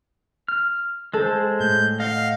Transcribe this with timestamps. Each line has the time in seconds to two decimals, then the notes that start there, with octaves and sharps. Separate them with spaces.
0.48 F6
1.13 G#3 A4 C5
1.60 A2 G6
2.00 D#5 F5 F#5 C7